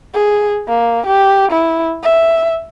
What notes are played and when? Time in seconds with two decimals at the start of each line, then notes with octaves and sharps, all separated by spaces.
0.14 G#4
0.68 A#3
1.06 G4
1.51 E4
2.03 E5